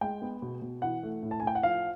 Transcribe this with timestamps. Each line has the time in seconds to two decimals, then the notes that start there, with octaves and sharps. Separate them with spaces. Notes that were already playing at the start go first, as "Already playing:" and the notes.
0.01 G#3 G5
0.22 B3
0.42 B2
0.62 B2
0.82 E3 F#5
1.03 A3
1.23 A2
1.31 A5
1.40 G#5
1.43 A2 G5
1.55 F#5
1.63 F3 F5